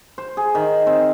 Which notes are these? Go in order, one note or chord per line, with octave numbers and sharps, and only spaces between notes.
C5
G#4
D#3
C4